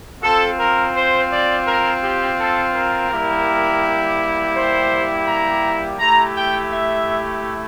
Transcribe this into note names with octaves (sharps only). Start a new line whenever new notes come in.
C4 F4 A4
A#4
C5
D5
A#4
G4
A4
A#4
G3 A#3 E4 G4
C5
A#5
A3 E4 G4 A#5
G5
E5